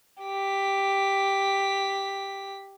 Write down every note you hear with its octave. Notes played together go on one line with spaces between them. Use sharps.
G4 B6